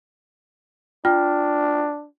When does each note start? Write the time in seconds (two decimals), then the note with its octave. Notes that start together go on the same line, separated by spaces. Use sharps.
1.05 D4 F4 G5 F6